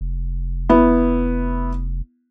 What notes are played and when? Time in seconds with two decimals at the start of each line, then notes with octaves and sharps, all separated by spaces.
0.01 F1
0.69 B3 E4